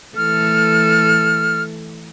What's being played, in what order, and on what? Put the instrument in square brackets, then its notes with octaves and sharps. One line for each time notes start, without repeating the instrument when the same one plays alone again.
[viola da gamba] E3 A3 A4 [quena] F6